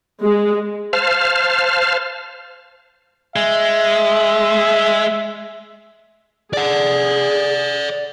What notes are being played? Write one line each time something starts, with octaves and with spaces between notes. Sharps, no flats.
G#3
C5 F5 A5 F6
G#3 E5
G#4 D5 F#5